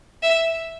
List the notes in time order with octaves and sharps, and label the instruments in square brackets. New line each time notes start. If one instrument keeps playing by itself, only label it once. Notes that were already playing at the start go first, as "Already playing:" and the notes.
[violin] E5